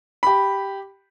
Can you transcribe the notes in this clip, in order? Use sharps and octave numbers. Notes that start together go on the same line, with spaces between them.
G4 B5